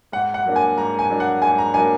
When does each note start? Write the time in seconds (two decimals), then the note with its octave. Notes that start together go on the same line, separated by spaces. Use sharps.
0.12 G#2 F#5
0.34 F#5
0.46 F#3 A#3 D4
0.56 G#5
0.77 G#2 A#5
0.99 G#5
1.10 F#3 A#3 D4
1.20 F#5
1.42 G#2 G#5
1.58 A#5
1.74 F#3 A#3 D4 G#5